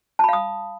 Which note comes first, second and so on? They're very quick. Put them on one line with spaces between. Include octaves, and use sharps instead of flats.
A5 B5 F5 D#6